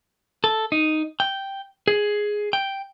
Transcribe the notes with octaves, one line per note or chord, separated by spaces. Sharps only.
A4
D#4
G5
G#4
G5